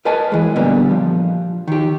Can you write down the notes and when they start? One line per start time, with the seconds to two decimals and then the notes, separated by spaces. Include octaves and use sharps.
0.05 A#4 B4 D#5 G#5 A5
0.32 E3 G#3
0.56 A#2 D3 G3 B3
0.91 F3
1.68 D#3 G4